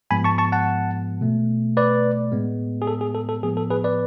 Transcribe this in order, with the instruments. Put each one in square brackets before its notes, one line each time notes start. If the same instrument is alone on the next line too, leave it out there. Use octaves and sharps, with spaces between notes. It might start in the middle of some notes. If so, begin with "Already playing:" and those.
[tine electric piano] G#2 F3 G#3 B3 G#5 B5
A5 C#6
A5 C#6
F#5 A5
B2 A3
B4 D5
A2 G#3 B3
G#4
A4
G#4
A4
A4
A2 F3 B3 G#4
A4
G#4 B4
B4 D5